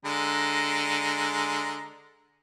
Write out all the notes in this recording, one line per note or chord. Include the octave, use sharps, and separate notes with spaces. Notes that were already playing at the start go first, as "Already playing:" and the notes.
D3 G#3 A#5